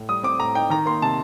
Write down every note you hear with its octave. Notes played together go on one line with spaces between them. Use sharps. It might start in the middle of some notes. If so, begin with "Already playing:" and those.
Already playing: A2
G3 D#6
C4 D6
A2 A#5
D#4 G5
D#3 A#5
A#3 C6
C3 A5